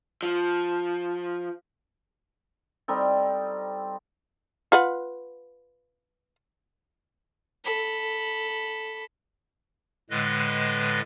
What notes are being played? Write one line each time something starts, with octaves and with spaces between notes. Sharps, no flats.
F3
G3 C4 D#4 A4
F4 B4 F#5
A4 B5
A2 D3 G#3 B4 D#5